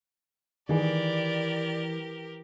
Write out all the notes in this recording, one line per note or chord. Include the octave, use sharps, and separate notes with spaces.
D#3 E3 G4 G#4 A#4 D5